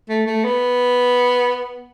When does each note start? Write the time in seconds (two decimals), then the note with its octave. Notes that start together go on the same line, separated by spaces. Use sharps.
0.09 A3
0.26 A3
0.44 B3